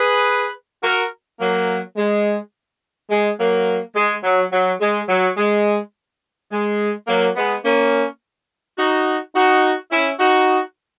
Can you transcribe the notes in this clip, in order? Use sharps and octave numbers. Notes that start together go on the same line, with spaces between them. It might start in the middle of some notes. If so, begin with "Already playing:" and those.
Already playing: G#4 B4
F#4 A#4
F#3 A#3
G#3
G#3
F#3 A#3
G#3
F#3
F#3
G#3
F#3
G#3
G#3
F#3 A#3
G#3 B3
A#3 C#4
D#4 F#4
D#4 F#4
C#4 E4
D#4 F#4